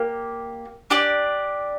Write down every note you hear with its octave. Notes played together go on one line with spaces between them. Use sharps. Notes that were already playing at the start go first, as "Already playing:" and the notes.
Already playing: A#3 G4
D4 G4 D5